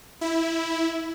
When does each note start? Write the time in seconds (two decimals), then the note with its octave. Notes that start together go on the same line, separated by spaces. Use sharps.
0.21 E4